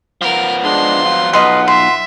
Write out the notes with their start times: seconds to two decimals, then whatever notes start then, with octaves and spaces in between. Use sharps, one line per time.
0.21 F3 B3 A#4
0.64 G#3 D4 C6
1.03 F#3 F4 F#5
1.33 B1 B4 D#5 C6
1.68 E5 C6